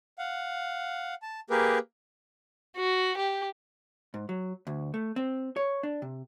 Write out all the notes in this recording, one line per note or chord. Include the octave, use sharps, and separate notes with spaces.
F5 F#5
A5
A#3 G4 G#4 A#4 B4
F#4
G4
G#2
F#3
D2
A3
C4
C#5
D4
C3